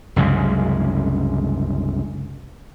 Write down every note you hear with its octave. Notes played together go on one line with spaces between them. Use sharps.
C2 F#2 C#3 G#3